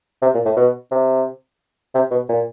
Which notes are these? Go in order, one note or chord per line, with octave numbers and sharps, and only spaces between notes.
C3
A#2
A2
B2
C3
C3
B2
A#2